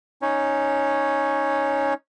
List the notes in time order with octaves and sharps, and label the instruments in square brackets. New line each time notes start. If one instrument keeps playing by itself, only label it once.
[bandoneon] C#4 D#4 C#5